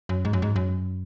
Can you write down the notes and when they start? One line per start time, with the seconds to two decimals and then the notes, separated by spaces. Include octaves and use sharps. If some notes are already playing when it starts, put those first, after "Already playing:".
0.09 F#2
0.25 G#2
0.33 F#2
0.42 G#2
0.56 F#2